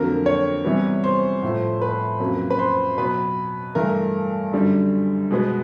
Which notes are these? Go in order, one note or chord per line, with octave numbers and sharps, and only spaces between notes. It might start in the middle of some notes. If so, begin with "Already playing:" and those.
Already playing: F2 D3 F#3 A#3 A#4
C#5
C3 E3 G3 B3
C5
A2 F3 A3
B4
F2 C#3 F#3 A#3
B4
C5
B2 F#3 B3 B4
G2 E3 A3 A#4
F#2 D3 G3
B2 G#3 B3